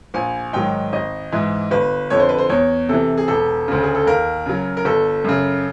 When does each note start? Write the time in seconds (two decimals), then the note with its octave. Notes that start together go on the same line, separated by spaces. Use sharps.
0.14 A#1 G#5
0.53 G#2 D#3 F#3 G5
0.93 G#1 D#5
1.32 G#2 E3
1.71 G1 B4
2.10 F2 D3 C#5
2.20 C5
2.29 B4
2.38 C5
2.49 E2 C#5
2.89 C3 E3 A4
3.17 G#4
3.28 E1 A4
3.68 D2 C#3
3.83 G#4
3.95 A4
4.07 D#2 A#4
4.46 C#3 F#3
4.77 A#4
4.85 G1 A4
5.24 F#2 C#3